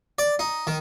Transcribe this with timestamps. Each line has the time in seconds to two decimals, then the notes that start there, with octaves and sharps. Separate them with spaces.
0.18 D5
0.39 D#4
0.67 D#3